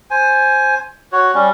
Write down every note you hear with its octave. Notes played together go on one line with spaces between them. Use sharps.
C5 G#5
F#4 C#5
G3 C#4